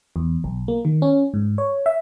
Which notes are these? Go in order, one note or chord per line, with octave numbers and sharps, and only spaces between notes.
E2
B1
A#3
D#3
C#4
G#2
C#5
E5